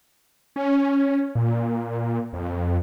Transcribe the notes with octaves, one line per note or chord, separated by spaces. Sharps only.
C#4
A#2
F2